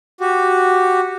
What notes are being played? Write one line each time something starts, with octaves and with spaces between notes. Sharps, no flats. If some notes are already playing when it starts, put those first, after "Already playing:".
F#4 G4